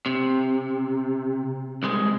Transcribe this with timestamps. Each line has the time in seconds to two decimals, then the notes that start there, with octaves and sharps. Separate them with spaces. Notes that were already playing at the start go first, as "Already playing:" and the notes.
0.06 C3
1.83 C2 G#3